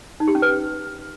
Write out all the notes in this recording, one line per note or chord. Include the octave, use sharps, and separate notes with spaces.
D#4
G4
C#4
B4